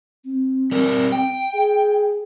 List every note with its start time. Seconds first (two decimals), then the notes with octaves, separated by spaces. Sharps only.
0.24 C4
0.72 G3 A#4
1.12 G5
1.54 G#4